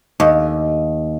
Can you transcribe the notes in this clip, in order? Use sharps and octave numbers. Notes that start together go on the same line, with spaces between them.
D#2